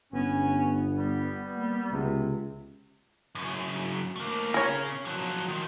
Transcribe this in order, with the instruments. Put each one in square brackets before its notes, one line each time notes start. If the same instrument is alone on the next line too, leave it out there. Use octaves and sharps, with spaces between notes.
[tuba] G1 [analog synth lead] B3 [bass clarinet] C#4
[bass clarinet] G3
[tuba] A#3
[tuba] C#2 [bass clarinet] C3
[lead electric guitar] F#2 C#3
A3 A#3
[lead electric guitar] C#3 C#4 [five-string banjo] A#4 C#5
[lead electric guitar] F3 F#3
D#3 F3